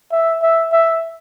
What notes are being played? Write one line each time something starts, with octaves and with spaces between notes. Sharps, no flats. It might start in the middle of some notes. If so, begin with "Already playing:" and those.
E5
E5
E5